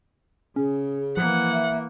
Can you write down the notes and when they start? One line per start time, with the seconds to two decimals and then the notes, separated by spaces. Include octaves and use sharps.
0.56 C#3 C#4 G#4
1.17 E3 F3 A#3 F#5
1.53 E5